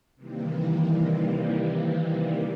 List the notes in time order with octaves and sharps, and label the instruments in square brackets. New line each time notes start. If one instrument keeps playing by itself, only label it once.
[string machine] C3 D#3 E3 G3 A#3